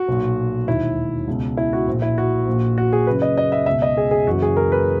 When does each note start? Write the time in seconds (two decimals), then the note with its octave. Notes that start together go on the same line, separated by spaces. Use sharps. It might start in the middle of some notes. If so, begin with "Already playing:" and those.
Already playing: F#4
0.08 B1 A#2
0.68 E1 D#2 D#3 E4
1.27 C#2 B2
1.57 E4
1.73 F#4
1.88 A#1 A#2
2.02 E4
2.18 F#4
2.47 A#1 A#2
2.78 F#4
2.93 G#4
3.06 F#1 F#2 C#3 B4
3.22 D#5
3.38 D#5
3.52 E5
3.66 C#2 B2 E5
3.82 D#5
3.97 G#4
4.11 G#4
4.27 F#1 F#2 E3 F#4
4.42 G#4
4.57 A#4
4.72 B4